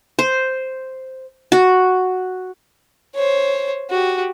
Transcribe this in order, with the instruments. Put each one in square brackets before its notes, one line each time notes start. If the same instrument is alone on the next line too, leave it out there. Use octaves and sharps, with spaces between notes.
[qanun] C5
F#4
[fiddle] C5 C#5
F#4 G4